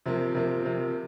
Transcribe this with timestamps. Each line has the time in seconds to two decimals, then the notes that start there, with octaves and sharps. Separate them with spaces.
0.06 C3 F3 A#3
0.34 C3 F3 A#3
0.65 C3 F3 A#3